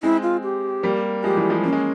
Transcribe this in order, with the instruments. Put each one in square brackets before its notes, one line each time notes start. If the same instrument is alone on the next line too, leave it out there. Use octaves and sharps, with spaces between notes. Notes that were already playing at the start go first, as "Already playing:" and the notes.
[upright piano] G#3 C4 [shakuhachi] E4
[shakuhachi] F4
G4
[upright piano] G3 A#3
[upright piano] F3 G#3 [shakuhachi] G4
[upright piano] E3 G3
F3 G#3
[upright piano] A#3 [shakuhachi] C#4
[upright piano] G#3